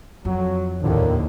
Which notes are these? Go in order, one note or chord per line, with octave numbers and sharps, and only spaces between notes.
F2 F#3
A#1 D#2 A2 D3 D#3 F3